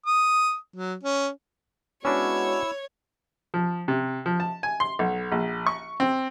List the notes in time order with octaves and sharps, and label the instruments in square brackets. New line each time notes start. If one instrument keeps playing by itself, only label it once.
[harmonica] D#6
F#3
C#4
[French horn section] G#3 B3 F#4 [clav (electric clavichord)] C#4 D4 [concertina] E4 E6 [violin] C#5
[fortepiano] F3
C3
F3
A5
G#5
C6
B1
A#1
C#6
C4